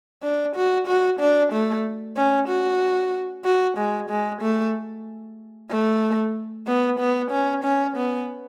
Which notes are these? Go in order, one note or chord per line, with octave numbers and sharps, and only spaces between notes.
D4
F#4
F#4
D4
A3
C#4
F#4
F#4
G#3
G#3
A3
A3
B3
B3
C#4
C#4
B3